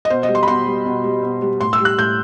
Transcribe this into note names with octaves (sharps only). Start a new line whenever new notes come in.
D#5
B2 C5
D#5
G3
C6
B5
B2 C6
G3
B2
G3
B2
G3
A2 C6
E6
G3
F#6
A2 G6